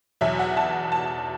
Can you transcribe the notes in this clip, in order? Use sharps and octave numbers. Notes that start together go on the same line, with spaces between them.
E2 B2 F#3 E5
F#5
A5
A5